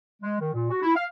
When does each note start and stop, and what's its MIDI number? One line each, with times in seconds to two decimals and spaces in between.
0.22 0.36 56
0.41 0.53 51
0.53 0.69 46
0.71 0.82 66
0.83 0.91 64
0.96 1.04 77